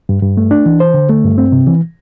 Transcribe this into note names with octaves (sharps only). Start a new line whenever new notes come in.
G2
G2
A3
D4
E3
C5
D3
A3
G2
C4
C3
E3